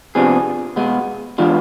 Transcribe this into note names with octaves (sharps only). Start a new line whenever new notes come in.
C3 F3 B3 D4 G#4
B2 G#3 B3
E3 G#3 B3 D4 F4